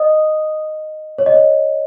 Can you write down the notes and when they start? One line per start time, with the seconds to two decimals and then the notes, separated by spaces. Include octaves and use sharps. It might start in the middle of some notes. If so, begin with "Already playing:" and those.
Already playing: D#5 D#6
1.18 C#5
1.26 D#5
1.34 C#5